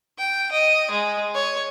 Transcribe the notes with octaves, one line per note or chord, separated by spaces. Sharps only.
G5
D#5
G#3
C#5